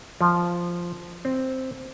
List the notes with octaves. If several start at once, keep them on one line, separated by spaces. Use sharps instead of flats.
F3
C4